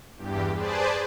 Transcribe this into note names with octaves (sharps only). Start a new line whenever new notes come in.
E2 G2 G4
G#4 B4 C5 D5 A5